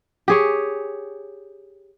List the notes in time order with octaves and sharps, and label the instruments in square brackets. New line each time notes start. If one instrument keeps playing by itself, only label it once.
[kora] G4 G#4 C#5